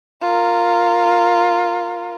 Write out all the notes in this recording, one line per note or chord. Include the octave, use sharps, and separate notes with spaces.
F4 A#4